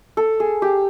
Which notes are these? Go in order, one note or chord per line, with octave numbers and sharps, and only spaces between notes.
A4
G#4
G4